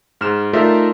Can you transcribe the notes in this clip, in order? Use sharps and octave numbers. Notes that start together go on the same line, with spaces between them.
G#2 F6 E7
A3 D#4 F4 A#4 D5 E5